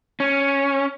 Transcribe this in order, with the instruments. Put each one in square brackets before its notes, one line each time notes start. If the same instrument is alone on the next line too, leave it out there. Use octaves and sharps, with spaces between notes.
[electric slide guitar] C#4